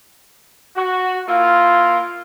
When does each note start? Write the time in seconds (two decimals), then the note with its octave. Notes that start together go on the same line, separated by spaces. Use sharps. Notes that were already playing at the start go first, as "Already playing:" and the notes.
0.77 F#4
1.28 A#3 E4 F4